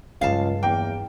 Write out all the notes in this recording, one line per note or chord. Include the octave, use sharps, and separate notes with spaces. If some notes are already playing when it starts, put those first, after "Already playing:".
C#2 G2 F#3 F5 A5
E2 A#3 G5